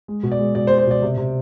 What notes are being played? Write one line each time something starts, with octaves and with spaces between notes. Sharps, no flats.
G#3
B2
D5
G#3
B2 D5
C5
G#3
C5
B2 D5
C3
C3